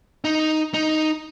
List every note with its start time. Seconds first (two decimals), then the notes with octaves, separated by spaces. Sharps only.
0.24 D#4
0.74 D#4